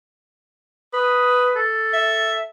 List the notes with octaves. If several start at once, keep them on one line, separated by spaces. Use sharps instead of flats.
B4 D#6
A4
E5